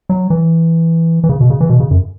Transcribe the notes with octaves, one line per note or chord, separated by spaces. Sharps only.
F#3
E3
E3
C#3
B2
C#3
E3
B2
C#3
F#2